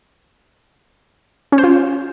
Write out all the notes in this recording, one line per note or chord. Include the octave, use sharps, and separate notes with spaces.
C#4
C5
F4